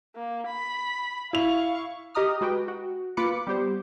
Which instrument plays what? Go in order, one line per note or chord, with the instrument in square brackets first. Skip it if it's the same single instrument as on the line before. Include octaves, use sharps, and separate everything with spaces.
[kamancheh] A#3
B5
[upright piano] E4 F7 [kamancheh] F5 C#6
[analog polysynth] G4 D#5 A#5 D#6 F6
G#3 F#4 B4 G5
F#4
A#3 F4 B4 B5 D6 C#7
G3 B3 G4 C5